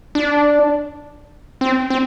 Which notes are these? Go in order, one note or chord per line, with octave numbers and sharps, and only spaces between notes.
D4
C4
C4